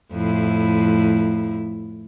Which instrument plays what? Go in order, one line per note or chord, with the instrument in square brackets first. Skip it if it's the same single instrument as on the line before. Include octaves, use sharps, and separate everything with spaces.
[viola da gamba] F2 A2 E4